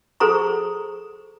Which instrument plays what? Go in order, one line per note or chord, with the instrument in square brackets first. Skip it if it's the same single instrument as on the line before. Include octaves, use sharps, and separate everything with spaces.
[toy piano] G#4 A4 C5 A#5 C#6